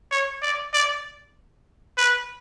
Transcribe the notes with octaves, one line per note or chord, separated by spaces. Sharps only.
C#5
D5
D5
B4